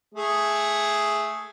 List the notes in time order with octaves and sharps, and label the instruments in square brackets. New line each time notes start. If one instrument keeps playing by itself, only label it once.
[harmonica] A3 G#4